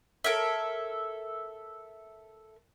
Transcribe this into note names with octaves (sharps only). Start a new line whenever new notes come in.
A4 A#4 C#5 E5